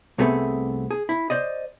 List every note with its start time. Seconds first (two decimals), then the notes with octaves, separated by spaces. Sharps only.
0.18 C2 C3 A3 B3 G#4
0.91 G#4
1.09 E4
1.30 C5 D5 D#5